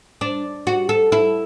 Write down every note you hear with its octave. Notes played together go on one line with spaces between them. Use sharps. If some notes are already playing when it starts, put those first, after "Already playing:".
D4
F#4
A4
E4